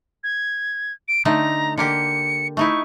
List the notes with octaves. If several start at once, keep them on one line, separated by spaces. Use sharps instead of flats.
G#6
D7
D3 A3 D#4 A#5
D3 A#3 G4 C#7
A3 D#4 E4 C#6